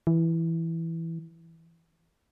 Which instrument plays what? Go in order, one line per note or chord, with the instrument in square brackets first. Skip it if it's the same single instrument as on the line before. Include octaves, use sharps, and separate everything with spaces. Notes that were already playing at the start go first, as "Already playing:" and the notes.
[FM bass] E3